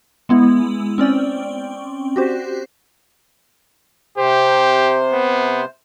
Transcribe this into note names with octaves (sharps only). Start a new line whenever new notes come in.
G#3 B3 E4
C4 C#4 D5 G5
F#4 G4 C5
C3 G4 C5
B3